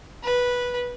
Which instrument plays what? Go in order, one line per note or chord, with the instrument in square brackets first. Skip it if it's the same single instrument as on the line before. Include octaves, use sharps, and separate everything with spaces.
[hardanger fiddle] B4